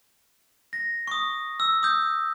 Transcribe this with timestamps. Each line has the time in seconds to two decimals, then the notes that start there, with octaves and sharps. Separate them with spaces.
0.73 A#6
1.08 C#6 D#6
1.60 E6
1.83 D#6 G6